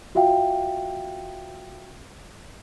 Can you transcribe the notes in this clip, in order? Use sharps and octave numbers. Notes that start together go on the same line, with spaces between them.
F4 F#4 E5 F5 G5